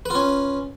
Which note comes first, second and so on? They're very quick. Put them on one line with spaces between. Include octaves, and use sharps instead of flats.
B4 F4 C#4